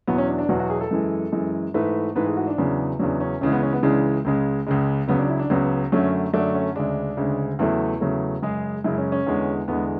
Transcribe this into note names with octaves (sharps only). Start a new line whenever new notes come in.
E2 B2 F#3 B3
C#4
D4
D4
E2 B2 F#3 F#4
F#4
G#4
A4
F#2 E3 G#3
F#2 E3 G#3
G#2 E3 A3 B4
G#2 E3 A3 B4
G#4
F#4
D4
E2 C#3 F#3
E2 C#3 F#3 D4
C#4
C#2 C#3 E3 G#3 C#4
B3
C#4
B3
C#2 C#3 E3 G#3 D4
C#2 C#3 G#3
C#2 C#3 G#3
C#2 C#3 F#3 B3
D4
E4
D4
C#2 C#3 F#3 B3
F#2 D3 F#3 A3 C#4
F#2 D3 F#3 A3 D4
C#4
D2 C#3 G#3 D4
D2 C#3 G#3
E2 C#3 F#3 A3 E4
E2 C#3 F#3 A3
F#2 C#3 G#3 G#4
F#2 C#3 G#3 E4
C#4
C#4
E2 D3 G#3
E2 D3 G#3 B3